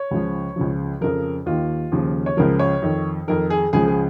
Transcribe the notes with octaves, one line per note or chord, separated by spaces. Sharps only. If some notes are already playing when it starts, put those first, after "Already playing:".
Already playing: C#5
C#2 C#3 F3
C#2 C#3 F3
F2 C#3 F3 A#4
D#2 D#3 F4
D#2 C#3 F3
C#5
C#2 C#3 F3 A#4
C#5
F2 D#3
F2 D#3 A#4
G#4
C#2 C#3 F3 G#4
G#4